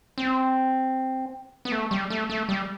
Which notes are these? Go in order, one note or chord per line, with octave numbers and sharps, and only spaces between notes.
C4
B3
A3
G3
A3
A3
G3